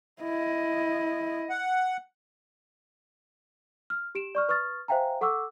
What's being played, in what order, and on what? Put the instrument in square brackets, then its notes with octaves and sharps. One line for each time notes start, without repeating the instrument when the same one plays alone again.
[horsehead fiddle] E4 D#5
[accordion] F#5
[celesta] F6
G4 D7 E7
D5 C#6 F6
B4 C#6 D#6 F6 A6
C5 E5 F5 G5 G#5 A#5
A4 F#5 C#6 D6 E6